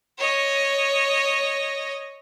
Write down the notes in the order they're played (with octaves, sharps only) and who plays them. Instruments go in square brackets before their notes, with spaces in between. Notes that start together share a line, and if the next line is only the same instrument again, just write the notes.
[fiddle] C#5 D#5